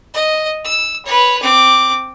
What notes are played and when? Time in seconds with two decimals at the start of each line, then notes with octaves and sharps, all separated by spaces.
0.14 D#5
0.65 E6
1.05 B4 C#5
1.42 C4 D6